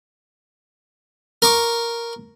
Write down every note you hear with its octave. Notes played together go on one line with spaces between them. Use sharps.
A#4 C#6 D6